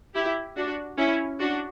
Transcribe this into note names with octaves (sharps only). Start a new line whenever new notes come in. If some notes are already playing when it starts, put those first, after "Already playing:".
E4 G4
D4 F#4
C#4 E4
D4 F#4